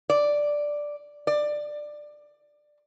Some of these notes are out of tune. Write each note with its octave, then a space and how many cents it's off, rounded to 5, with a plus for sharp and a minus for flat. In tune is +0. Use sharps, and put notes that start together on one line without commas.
D5 +0
D5 +15